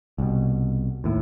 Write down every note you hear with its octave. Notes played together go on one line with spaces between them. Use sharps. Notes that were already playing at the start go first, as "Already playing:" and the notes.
C2 B2
D#2 A2